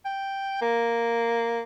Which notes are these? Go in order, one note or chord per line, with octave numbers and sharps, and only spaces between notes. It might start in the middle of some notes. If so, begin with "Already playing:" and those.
G5
A#3